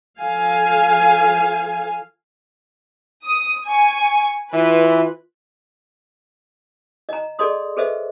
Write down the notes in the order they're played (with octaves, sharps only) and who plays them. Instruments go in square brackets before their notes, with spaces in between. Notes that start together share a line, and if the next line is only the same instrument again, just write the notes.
[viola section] F3 A4 F5 G#5
[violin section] D#6
G#5 C#6
[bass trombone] E3 [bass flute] F4 [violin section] B4
[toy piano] D#5 A#5
G#4 A4 D5 D#5 C6 D#6
G#4 A4 B4 C5 D#5 E5